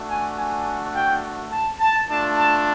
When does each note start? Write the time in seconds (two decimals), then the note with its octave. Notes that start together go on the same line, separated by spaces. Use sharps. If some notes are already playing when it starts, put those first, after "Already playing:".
Already playing: A3 D4 F#4
0.10 G#5
0.38 G#5
0.95 G5
1.51 A5
1.80 A5
2.09 A3 D4 F4 A5
2.37 A5